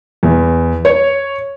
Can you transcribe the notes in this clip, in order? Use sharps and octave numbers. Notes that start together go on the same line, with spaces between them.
E2
C#5